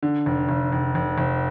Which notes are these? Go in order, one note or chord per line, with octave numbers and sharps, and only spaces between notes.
D3
F1
F1
F1
F1
F1